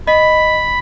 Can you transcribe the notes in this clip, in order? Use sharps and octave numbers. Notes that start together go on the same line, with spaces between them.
D#5 B5